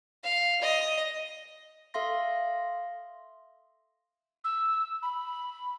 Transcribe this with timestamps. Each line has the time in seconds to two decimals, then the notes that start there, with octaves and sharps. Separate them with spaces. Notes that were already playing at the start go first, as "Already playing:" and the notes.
0.24 F5
0.62 D#5
1.94 A4 E5 F5 C6 A#6
4.44 E6
5.02 B5